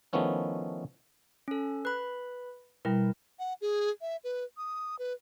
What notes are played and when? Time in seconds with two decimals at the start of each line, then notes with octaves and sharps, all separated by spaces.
0.13 D#3 F3 A3 B3 C#4 E4
1.48 C#4 A4
1.85 B4 B5 F#6
2.85 B2 G3 E4 A#4
3.39 F#5
3.61 G#4
4.01 E5
4.24 B4
4.57 D#6
4.99 B4